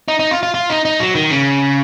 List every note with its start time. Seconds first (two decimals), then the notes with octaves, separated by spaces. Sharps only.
0.08 D#4
0.19 D#4
0.31 F4
0.43 F4
0.54 F4
0.70 D#4
0.85 D#4
1.00 F#3
1.15 D#3
1.30 C#3